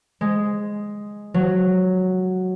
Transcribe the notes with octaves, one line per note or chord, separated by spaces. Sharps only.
G#3
F#3